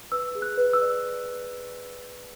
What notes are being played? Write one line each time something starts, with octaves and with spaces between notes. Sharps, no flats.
B4 E6
G#4
F#6
B4
E6
D5